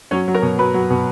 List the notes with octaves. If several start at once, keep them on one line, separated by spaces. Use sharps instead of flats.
F#3 C#4 C#5
F#3
A#4 A#5
B2
F#3 B4 B5
F#3
B2